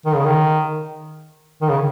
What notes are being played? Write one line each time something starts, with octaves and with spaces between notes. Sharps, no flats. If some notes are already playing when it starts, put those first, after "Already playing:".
D#3
C#3
D#3
D#3
C#3